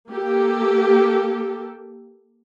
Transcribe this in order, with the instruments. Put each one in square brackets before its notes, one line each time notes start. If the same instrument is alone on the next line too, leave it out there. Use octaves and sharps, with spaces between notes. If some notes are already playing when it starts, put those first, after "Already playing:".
[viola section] A#3 G4 A4